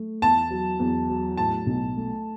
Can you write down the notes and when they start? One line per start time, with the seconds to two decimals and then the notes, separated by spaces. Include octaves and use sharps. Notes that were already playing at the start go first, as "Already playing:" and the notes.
Already playing: A3
0.22 E2 A5
0.50 F#3
0.79 E2
1.10 F#3
1.37 A2 A5
1.67 B1
1.97 A3